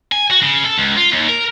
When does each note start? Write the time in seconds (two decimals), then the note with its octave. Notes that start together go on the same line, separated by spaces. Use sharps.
0.12 G#5
0.30 F#4
0.42 C#3
0.65 A4
0.78 C#2
0.96 F4
1.12 D#2
1.29 A#4